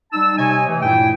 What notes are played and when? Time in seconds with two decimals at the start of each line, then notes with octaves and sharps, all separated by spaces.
0.12 G3 D#4 A5 E6
0.37 C3 C#5 D#5 G#5
0.66 C3 E3 A3
0.81 G2 A#2 E4 G5